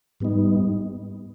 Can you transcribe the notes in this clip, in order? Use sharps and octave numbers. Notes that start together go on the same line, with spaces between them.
G#2 G3 B3 D#4